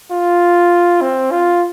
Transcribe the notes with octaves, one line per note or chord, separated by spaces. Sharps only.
F4
C4
F4